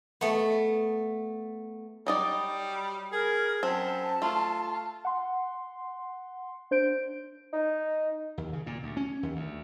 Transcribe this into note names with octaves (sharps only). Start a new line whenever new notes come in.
A3 B3
F#3 G3 D#4 D5
G#4 A#4
F#2 C4 A5
A3 F4
F#5 C6
D4 C5 G6 D7
D#4
D#2
C#3
A#2
D2
C#4
D#2
D2